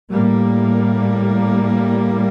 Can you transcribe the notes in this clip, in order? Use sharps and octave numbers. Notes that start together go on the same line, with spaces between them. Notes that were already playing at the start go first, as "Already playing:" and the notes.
A2 G3 A#3